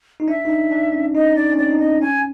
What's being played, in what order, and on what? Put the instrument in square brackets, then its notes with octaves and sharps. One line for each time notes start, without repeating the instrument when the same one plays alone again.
[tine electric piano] D#4
[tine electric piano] D4 [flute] E5
[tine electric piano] D#4
D4
D4
C#4
[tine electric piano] D#4 [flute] D#5
[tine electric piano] D4 [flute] D5
[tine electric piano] C#4
[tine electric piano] C4 [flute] D5
[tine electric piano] D#4
[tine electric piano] D4 [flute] D#5
[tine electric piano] C#4 [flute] G#5